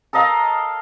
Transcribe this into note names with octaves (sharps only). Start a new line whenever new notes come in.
A4 A#4 D#5 F5